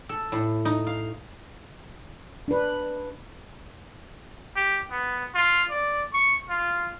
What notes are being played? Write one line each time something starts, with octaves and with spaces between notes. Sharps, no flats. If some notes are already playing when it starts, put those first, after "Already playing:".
A4
A2
D#4
F5
D4 B4
G4
B3
F4
D5
C#6
F4